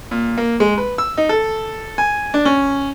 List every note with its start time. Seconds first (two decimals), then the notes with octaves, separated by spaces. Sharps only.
0.11 A#2
0.38 A#3
0.60 G#3
0.78 B4
0.98 E6
1.18 D#4
1.29 A4
1.98 G#5
2.34 D4
2.45 C#4